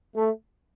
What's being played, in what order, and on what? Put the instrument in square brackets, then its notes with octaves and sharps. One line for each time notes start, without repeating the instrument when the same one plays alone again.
[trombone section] A3